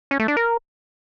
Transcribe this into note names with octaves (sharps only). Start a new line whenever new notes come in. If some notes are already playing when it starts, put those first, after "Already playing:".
C#4
A3
D4
A#4